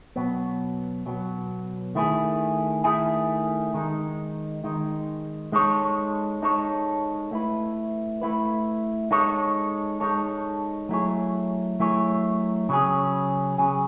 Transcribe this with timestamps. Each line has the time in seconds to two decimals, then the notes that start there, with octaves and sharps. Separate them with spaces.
0.16 B2 F#3 B3
1.06 B2 F#3 B3
1.95 D#3 A3 E4 G#4
2.84 D#3 A3 E4 G#4
3.74 D#3 G#3 D#4
4.64 D#3 G#3 D#4
5.52 G#3 D#4 A4 C#5
6.42 G#3 D#4 A4 C#5
7.31 A3 E4 B4
8.22 A3 E4 B4
9.11 G#3 D#4 A4 C#5
10.00 G#3 D#4 A4 C#5
10.89 F#3 A3 E4 G#4 C#5
11.80 F#3 A3 E4 G#4 C#5
12.69 C#3 F#3 C#4 G#4
13.58 C#3 F#3 C#4 G#4